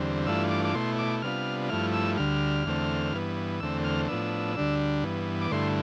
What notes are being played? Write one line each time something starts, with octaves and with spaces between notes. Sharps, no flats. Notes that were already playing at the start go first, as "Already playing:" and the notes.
Already playing: E2 D3 G3 C4
G2 E3 A3 D4 F4 E6
D6
D6
B2 A3 E4 C6
D6
C3 G3 B3 D4 F4 F6
G2 F3 A3 E4 F6
E6
D2 D3 G3 F6
E2 D3 A3 C4
G2 E3 B3
E2 D3 A3 C4 E6
F6
A2 F3 B3 D4 E6
D2 D3 G3 D4
G2 E3 B3
D6
G2 D3 A3 E4 C6